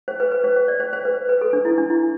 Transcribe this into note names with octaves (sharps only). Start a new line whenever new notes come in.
C5
B4
B4
C5
C5
D5
C5
C5
B4
B4
A4
D4
E4
D4
E4